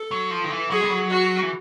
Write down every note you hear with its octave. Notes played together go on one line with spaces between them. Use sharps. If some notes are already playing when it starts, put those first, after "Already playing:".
Already playing: A4
F#3
F3
D#3
E3
F#3 G#4
G3
F#3
F#4
E3